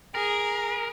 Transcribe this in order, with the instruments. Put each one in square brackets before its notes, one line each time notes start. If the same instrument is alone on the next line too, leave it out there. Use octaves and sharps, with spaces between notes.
[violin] G#4 [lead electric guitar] A#4